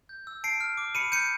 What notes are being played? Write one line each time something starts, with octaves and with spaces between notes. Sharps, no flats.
G6
E6
A5 C7 D7
F6
D6
B5 C#7 D#7
G6 C#7 D#7